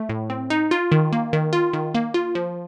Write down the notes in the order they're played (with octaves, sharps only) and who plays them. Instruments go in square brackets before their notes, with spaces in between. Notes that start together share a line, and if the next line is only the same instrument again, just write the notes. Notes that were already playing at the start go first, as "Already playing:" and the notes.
Already playing: [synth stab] A3
A2
C4
D#4
F4
D#3
A#3
D#3
F4
D#3
A#3
F4
F3